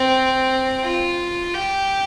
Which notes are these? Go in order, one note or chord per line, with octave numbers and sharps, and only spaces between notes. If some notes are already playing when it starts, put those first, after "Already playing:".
Already playing: C4
F4
G4